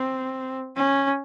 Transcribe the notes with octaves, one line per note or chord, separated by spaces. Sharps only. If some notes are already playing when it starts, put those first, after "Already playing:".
Already playing: C4
C#4